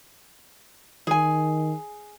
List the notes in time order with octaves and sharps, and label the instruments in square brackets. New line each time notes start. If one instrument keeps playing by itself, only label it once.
[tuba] D#3 [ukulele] G#4 G#5